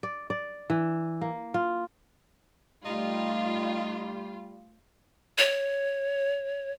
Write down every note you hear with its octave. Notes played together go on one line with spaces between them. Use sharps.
D5
D5
E3
A#3
F4
G3 A3 D#4 F4
C#5